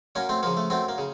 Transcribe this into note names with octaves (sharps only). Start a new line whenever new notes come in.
F#2 A#3 C#4
A3 C4
C#3 F3 A#3
A3
F#2 A3 C4
A#3
C#3